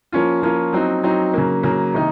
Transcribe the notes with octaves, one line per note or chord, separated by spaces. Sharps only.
F3 A#3 C#4 F4
F3 A#3 C#4 F4
F#3 C4 D#4
F#3 C4 D#4
C#3 F#3 A#3
C#3 F#3 A#3
C3 D#3 A#3 D#4